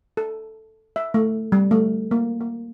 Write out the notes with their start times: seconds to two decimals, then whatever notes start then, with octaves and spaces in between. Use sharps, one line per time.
0.17 A4
0.96 E5
1.14 A3
1.52 G3
1.71 A3
2.11 A#3
2.41 A#3